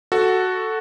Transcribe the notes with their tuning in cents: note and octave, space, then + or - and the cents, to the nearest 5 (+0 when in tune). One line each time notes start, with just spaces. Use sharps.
F#4 +0 A4 +0